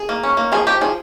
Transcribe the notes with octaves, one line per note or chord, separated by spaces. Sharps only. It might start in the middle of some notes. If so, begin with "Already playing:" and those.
Already playing: G#4
A#3
C#4
A#3
F3 G#4
F3 G4
F3 G#4